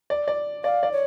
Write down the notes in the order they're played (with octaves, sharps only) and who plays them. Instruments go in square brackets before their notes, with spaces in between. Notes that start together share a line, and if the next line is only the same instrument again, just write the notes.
[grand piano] D5
D5
[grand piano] D5 [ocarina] F5
[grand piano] D5
[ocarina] C#5